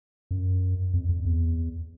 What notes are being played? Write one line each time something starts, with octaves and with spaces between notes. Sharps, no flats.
F#2
F2
F2
E2